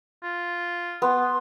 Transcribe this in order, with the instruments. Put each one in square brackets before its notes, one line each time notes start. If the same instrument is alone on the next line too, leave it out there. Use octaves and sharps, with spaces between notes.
[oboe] F4
[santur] B3 [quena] C6